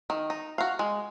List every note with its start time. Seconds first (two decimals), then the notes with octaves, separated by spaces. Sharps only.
0.10 D#3
0.30 D#4
0.58 F#4 F5
0.79 G#3